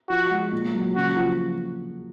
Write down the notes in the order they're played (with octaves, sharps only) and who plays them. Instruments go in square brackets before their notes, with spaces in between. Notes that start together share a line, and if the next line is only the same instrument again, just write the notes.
[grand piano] F3 [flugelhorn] F#4
[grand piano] G#3
A#2
F#3
[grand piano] C#3 [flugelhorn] F#4
[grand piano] F3